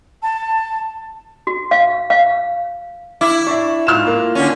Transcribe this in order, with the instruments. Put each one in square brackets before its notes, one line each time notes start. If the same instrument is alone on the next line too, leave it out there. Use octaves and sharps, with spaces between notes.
[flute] A5
[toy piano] F#4
F5
F5
[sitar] E4 [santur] D6
[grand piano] D4 E5 [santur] C#5
[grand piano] G#2 F6 E7 [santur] F4
[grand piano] A#3
[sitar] D3 C#4